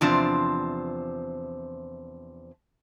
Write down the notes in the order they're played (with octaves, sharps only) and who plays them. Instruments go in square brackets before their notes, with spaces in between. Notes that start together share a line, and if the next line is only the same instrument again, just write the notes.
[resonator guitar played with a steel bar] E2 C3 F3 C4 D4 C5